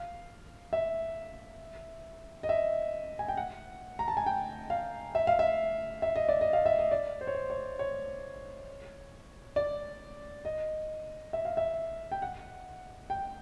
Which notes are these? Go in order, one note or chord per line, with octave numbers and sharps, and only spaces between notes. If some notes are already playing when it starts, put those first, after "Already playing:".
Already playing: F5
E5
D#5
E5
G#5
G5
F#5
A#5
A5
G#5
G5
F5
E5
F5
E5
E5
D#5
D5
D#5
F5
E5
D#5
D5
C5
C#5
C5
C#5
C#5
D5
D#5
E5
F5
E5
G5
F#5
G5